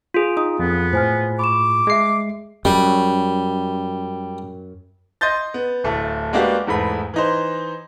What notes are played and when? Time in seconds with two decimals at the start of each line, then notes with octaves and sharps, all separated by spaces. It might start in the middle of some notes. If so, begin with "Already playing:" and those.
0.14 F4 G#4
0.37 D#4 D#6
0.59 F2 B3
0.93 A2 C5 G#5 F6
1.39 B5 C#6 D6 E7
1.87 G#3 G#4 E5 C7
2.65 F#2 G3
5.21 D#5 C6 G6 A6
5.54 B3
5.84 D1 A3 A5
6.33 G#3 A#3 B3 D4 F#4 G4
6.67 E2 G#2 A3 B5
7.14 E3 D#4 C5